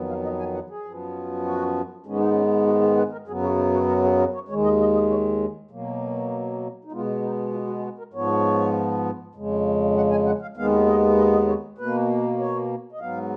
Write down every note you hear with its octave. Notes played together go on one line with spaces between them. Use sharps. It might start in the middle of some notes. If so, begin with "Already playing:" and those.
Already playing: F2 D#3 F#3 B3
F5
D#5
G#5
F#5
G#4
F#2 F3 B3
F#4
G#2 D#3 G#3 B3 C#4
D#4
C#4
F#4
G#4
B4
A#4
F#2 C#3 F#3 B3 G#4
F#4
D#4
F#4
A#4
G#4
A#4
C#5
D#2 D#3 G#3 C#5
D#5
D#5
D#5
C#5
B2 F#3 A#3
D#4
B2 G#3 B3 F4
D#4
F4
F#4
G#4
F#4
A#4
G#2 F3 B3 C#5
F2 C#3 G#3
F#5
G#5
F#5
F5
D#2 D#3 G#3 B3 F5
D#5
D#5
D#5
C#5
B2 A#3 B4
C#5
D#5
G#2 F#3 B3 F5